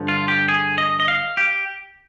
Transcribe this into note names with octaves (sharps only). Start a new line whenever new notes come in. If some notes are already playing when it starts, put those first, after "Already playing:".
Already playing: G2 D3 F3
F4
G4
G#4
D#5
D#5
F5
G4